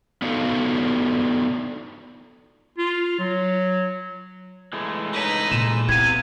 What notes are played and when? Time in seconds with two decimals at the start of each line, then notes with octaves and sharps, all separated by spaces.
0.22 B3 D4 D#4 F4 F#4 A4
2.78 F4
3.20 F#3
4.73 E3 G#3 A3
5.13 D#4 B4
5.51 A#2 E7
5.89 C3 B3 E4 F5 G#6 D#7